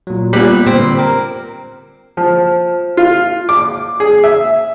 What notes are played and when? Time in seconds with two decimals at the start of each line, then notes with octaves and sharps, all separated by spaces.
0.07 A#2 F#3
0.33 A#2 G3 B3 F#6 B6
0.67 D3 C4 G4
0.99 A#4
2.17 F3
2.97 F4
3.49 D6
4.00 G#4
4.24 E5